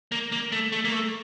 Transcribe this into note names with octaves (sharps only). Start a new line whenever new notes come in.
A#3
A#3
A3
A3
A#3
A3